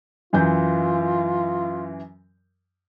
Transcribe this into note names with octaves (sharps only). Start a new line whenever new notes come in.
F#2 E3 F4 G6